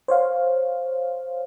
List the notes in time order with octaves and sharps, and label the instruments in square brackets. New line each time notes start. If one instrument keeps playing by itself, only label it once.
[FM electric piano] C5 C#5 F5